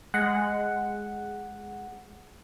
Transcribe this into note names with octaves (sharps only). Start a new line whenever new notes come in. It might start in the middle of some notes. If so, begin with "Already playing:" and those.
G#3 F#5